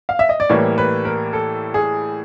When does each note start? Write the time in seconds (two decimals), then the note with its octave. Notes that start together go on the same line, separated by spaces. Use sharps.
0.09 F5
0.19 E5
0.29 D#5
0.40 D5
0.49 A2 E3 G3 A#3 C#5
0.78 B4
1.05 A#4
1.33 A4
1.74 G#4